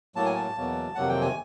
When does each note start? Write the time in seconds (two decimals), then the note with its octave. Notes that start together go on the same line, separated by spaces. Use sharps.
0.15 A2 F#3 A#3 A5
0.25 G#5
0.35 A5
0.56 E2 B2 F#3 A#3
0.95 F2 C3 D#3 F#3 A#3 F#5
1.09 G5
1.21 G#5